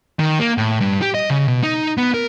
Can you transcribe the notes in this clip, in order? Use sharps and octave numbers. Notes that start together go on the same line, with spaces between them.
D#3
A#3
A2
G2
G4
D#5
C#3
B2
D#4
B3
A#4